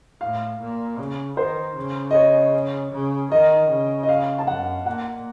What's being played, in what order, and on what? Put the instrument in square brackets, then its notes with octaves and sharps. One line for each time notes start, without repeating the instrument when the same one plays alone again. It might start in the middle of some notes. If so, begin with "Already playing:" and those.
[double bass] A2 [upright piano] F5
[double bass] A#2
C#3
[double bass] D#3 [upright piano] C5
[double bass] C#3
[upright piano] D#5
C#5
[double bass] C#3
[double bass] D#3 [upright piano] D#5
[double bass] C#3
[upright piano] D#5
F5
A5
[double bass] F#2 [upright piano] F#5
[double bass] A#2 [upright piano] F#5